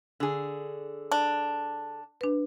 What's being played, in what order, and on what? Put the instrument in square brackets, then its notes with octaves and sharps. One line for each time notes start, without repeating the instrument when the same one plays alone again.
[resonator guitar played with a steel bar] D3 G#4
[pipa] D4
[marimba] D4 B4